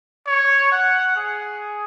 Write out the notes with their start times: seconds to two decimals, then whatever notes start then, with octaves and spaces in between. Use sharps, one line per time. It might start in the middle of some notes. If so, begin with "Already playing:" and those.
0.26 C#5
0.72 F#5
1.16 G#4